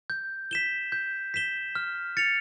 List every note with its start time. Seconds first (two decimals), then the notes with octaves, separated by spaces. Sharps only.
0.10 G6
0.51 B6 E7 G7
0.92 G6
1.34 B6 E7 G7
1.75 F6
2.17 A6 C#7 F7